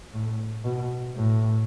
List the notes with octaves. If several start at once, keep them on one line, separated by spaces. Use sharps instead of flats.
A2
B2
A2